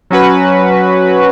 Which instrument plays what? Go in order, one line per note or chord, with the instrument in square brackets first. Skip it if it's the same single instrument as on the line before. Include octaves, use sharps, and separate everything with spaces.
[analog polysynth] F#3 C#4 F#4 B4